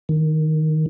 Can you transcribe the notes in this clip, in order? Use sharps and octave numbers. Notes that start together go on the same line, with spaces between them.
D#3